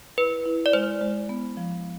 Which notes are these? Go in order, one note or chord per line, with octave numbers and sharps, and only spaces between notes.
E4 B4
E4
D5
G#3 C5
G#3
B3
F3